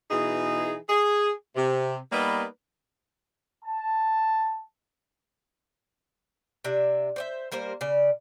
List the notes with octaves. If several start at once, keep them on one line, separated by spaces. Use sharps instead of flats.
B2 E3 D#4 G#4
G#4
C3
G3 A#3 B3 D#4 B4 D5
A5
C3 D4 E5
C5 D5 E5
G3 A#3 A#4 C5
C#3 D5